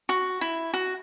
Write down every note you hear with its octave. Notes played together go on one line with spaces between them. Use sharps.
F#4
E4
F#4